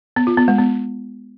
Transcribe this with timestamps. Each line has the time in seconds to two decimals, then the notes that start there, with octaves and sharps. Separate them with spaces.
0.16 B3
0.27 F4
0.37 B3
0.48 G#3
0.58 B3